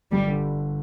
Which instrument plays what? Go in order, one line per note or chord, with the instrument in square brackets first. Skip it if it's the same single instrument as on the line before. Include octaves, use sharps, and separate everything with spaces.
[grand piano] G1 [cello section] G3
[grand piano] D3